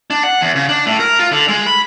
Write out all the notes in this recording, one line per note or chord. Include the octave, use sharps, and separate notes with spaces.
D4
F#5
E2
C#3
D4
A2
A#4
F4
D3
G#3
B5